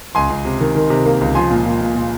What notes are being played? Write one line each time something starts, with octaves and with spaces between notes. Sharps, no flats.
C#2 G#5 C6
C#2
C3
D#3
D#3
C3
A#3
C#2
F3 G#5 C6
A#2
A#2
A#2
A#2